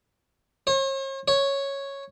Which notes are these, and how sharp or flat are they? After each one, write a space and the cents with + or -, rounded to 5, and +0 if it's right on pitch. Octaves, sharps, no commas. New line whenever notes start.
C#5 -45
C#5 -5